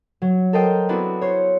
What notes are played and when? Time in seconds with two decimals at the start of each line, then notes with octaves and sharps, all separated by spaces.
0.22 F#3
0.53 A4 A#4 C5 D#5 G5
0.89 B3 C4 D4 E4 F#4
1.21 C5 C#5